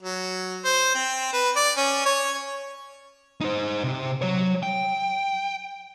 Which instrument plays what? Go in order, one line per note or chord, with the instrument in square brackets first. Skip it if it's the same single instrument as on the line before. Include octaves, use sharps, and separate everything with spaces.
[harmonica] F#3
C5
C4
B4
D5
C#4
C#5
[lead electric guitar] D#4 C5
C3 G4
F#3 C#5
G5